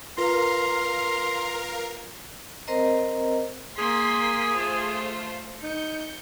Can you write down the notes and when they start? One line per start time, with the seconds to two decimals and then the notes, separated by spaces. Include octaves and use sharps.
0.18 F4 A#4 B4 F5 A#5 C6
2.67 C4 A#4 C5 D#5 A#5
3.78 A#3 G#4 C6 B6
4.55 A3 F4 C5
5.62 D#4 G6 C#7